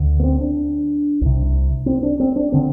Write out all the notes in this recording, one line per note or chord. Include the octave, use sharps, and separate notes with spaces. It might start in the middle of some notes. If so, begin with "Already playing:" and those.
Already playing: D2 D3
B3
C4
D4
C2 C3
C4
D4
C4
D4
D3 C4